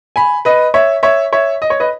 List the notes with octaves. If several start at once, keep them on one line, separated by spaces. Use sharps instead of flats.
G#5 B5
B4 D#5
C#5 E5
C#5 E5
C#5 E5
D#5
C#5
B4 D#5